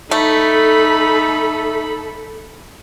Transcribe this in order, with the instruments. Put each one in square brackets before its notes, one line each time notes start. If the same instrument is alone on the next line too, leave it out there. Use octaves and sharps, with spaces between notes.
[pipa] A3 [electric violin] D#4 B5 [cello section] A4